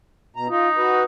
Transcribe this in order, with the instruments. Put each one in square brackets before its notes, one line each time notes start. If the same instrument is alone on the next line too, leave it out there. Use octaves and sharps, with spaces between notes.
[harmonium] B2 A#5
[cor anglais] D#4 [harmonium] F4
[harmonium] F#4 B4